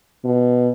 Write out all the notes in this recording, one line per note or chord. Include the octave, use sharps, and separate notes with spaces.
B2